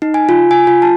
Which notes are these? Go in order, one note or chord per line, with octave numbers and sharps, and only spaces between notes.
D#4
G#5
F4
G#5
F4
A5